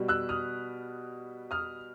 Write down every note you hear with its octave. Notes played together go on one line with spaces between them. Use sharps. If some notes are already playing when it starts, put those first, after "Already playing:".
Already playing: B2 G3
E6 F#6
D#6 F6
D#6 F6